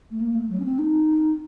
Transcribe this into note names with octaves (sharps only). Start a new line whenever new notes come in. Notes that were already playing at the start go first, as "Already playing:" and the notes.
A3
A#3
A3
F#3
C#4
C4
D#4